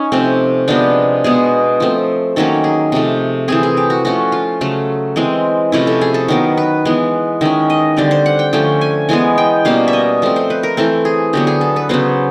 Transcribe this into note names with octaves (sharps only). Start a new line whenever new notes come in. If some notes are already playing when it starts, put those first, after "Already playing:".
Already playing: C#4 D#4
C3 F3 A3 C4
C3 F3 G#3 B3 D4
B2 G#3 B3 G#4
F3 A3 C4
D#3 F#3 A#3 C#4 A4
G#4
C3 F3 A3
E3 A3 C4 G#4
G#4
G4
F#4
F3 A3 C#4 F#4
F4
C#3 F#3 A3
E3 G#3 C4
C3 F3 A3 C#4 E4
A4
G#4
A4
D#3 F#3 B3 A#4
B4
E3 G#3 B3
D#3 G#3 C#4 E5
D#5
D3 G3 C4 D5
C5
F#5
G5
D3 F3 A3 C#4 G5
G#5
E3 G#3 B3 G#5
G5
B2 G3 A#3 C#4 F5
E5
D#5
F3 A3 C4
C5
B4
A#4
E3 A3 C4 A4
G#4
D3 F#3 B3 G4
G#4
A4
B4
C#3 F#3 B3 C5